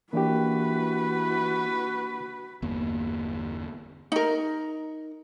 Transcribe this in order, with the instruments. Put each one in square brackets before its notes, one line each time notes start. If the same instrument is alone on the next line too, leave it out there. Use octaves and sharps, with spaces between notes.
[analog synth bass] E3 [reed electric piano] A#3 D4 G4 [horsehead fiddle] F#4 B4
[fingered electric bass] G1 E2 A#3
[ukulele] D#4 A#4